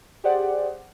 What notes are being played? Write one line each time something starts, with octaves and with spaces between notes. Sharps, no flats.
G4 G#4 C5 D5 F#5